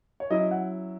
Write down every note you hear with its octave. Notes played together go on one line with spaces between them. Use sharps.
C#5
F#3 C#4 E4 D#5
F#5